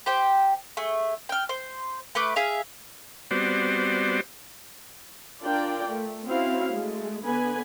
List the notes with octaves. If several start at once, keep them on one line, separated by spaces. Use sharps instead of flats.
G4 C5 G5
A3 G#4
G5 F6
C5
A3 B4 D6
G#4 E5 F5
G3 B3 C4 F#4 C5 D5
D4 F4 A#4 D5 G5
A3
C4 C#4 E4 F#4 F5
G#3 A3
D3 B3 B4 G#5